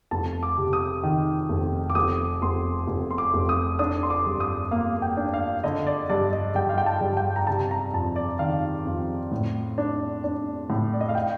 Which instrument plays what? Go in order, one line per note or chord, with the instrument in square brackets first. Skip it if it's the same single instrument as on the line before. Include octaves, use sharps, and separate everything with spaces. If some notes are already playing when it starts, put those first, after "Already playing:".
[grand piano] F1 A5
D6
C3
D#6
D#3
F1
D6
F1 D#6
F1 C6
F1
C6
D6
F1
D#6
D4 D#6
C6
D6
G2
D#6
A#3 F5
G5
D4
F5
D3 D#5
D5
G2 D5
D#5
G2 G5
F5
G5
A5
G2
G5
A#5
C3 A5
A#5
F2 A5
D5
D#3 F5
F2
A2
D4
D4
A2
D5
D#5
F5
G5